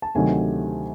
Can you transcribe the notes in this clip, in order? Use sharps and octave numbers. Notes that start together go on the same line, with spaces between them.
A5
D2 C3 D#3 F#3 G#5